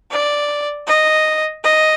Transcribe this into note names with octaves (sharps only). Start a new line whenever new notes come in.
D5
D#5
D#5